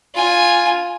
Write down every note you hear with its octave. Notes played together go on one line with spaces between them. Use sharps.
F4 G#5